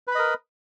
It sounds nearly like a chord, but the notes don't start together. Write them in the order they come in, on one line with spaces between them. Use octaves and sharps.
B4 B5 D#5 A#4